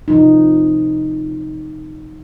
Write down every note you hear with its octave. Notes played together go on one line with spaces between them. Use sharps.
C3 F3 D#4